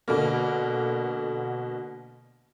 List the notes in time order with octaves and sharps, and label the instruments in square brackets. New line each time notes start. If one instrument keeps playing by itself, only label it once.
[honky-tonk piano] B2 D3 A#3